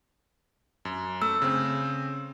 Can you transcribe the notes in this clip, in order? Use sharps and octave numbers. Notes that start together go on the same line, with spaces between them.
F#2
A3 E6
C#3 C4